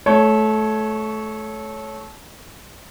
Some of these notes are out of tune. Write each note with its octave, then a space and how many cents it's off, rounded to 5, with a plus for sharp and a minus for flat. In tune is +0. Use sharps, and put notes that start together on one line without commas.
A3 -20 C#5 +0